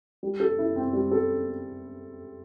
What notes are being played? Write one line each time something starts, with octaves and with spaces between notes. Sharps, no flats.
G3
A4
E4
C4
G3
A4